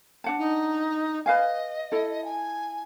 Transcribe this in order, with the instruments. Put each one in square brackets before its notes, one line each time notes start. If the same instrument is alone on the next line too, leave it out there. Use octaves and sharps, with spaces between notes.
[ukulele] D4 F#5 A5
[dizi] D#4
[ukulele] B4 F5 G#5 [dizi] D#5
[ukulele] E4 A4
[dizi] G#5